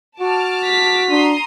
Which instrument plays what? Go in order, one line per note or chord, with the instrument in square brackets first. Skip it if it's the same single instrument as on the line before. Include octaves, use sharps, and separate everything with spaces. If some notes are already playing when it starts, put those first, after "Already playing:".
[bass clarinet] F#4 [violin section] A5 D6 F6
[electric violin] B6
[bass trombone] D4 [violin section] A#5 C6 D#6